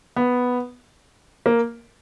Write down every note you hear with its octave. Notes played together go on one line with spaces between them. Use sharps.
B3
A#3